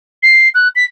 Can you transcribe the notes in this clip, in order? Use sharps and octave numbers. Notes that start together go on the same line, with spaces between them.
C7
F#6
B6